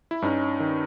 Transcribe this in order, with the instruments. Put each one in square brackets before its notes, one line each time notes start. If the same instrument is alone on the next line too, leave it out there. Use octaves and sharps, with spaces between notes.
[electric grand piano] E4
G2 C#4 D#4
D#3